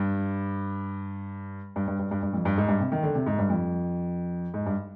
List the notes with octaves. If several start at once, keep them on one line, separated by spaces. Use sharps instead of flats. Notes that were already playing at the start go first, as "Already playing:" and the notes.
Already playing: G2
G2
G2
G2
G2
G2
F2
G2
G#2
G2
C3
D#3
D3
C3
G#2
G2
F2
G#2
G2